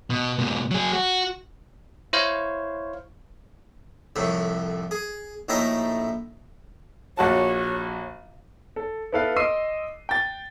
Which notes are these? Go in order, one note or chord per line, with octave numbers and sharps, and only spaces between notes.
B2
G#2 B2
F#3 G#4
F#4
E4 C5 C#5 F5
C2 F2 A2 C3
G#4
A#1 A2 D#4 E4 A#4 A#5
A#1 F#4 C#5 A5
A4
B3 E4 A4 B4 F5
D#5 C6 D6 E6 C7 D#7
G5 A6